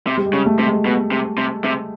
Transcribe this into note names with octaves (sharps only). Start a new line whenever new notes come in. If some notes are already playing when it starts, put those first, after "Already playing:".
C3
G3
G#3
C#3
A3
C3
G#3
B2
C3
C3
C3